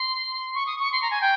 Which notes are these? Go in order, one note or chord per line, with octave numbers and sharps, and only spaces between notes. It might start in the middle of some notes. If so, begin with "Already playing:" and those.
Already playing: C6
C#6
D#6
C#6
C6
A#5
G#5
G5